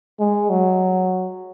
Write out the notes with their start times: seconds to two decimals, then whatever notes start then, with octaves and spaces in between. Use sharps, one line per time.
0.19 G#3
0.49 F#3